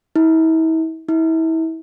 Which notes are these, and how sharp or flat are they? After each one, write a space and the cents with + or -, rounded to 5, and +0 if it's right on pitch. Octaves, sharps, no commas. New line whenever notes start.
E4 -40
E4 -35